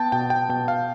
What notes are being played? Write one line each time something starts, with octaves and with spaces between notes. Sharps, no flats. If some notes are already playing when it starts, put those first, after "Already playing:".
Already playing: B3 G5 A5
B2 G5
G5
B2 G5
F5